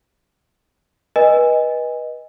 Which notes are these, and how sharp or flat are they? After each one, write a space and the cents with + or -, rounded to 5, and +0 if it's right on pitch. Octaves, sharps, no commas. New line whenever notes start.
B4 -30 D#5 +0 G#5 -20